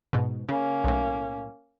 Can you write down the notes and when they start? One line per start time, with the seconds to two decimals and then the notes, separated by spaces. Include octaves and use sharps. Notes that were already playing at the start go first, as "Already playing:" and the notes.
0.13 G#2 B2
0.49 C#3 A#3 C#4
0.84 B1 A2